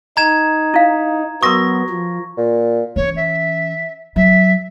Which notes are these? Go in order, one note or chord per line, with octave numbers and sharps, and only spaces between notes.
D#4 A#5 G#6 E7
E4 F5
F#3 B3 A#4 C6 C#6 D#6 A#6
F3
A#2
E3 C#4 C#5
E5
F#3 E5